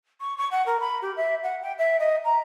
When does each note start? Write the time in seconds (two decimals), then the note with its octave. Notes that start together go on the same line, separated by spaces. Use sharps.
0.21 C#6
0.38 C#6
0.51 F#5
0.66 A#4
0.80 B5
1.02 G4
1.16 E5
1.43 F#5
1.62 G5
1.78 E5
1.99 D#5
2.24 A#5